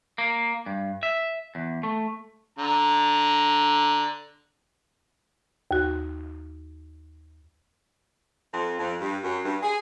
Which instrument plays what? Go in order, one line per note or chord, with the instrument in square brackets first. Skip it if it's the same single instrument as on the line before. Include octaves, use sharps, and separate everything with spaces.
[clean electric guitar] A#3
G2
E5
E2
A3
[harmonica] D3 A#5
[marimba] D#2 F#4
[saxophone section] F2
F2
G2
F#2
G2
G#4